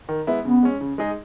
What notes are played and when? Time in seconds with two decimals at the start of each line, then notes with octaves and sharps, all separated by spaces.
0.09 D#3
0.27 G#3 B3 E4
0.45 C#3 B3
0.63 G#3 C#4
0.81 C#3
0.98 G#3 D#4 G#4 D#5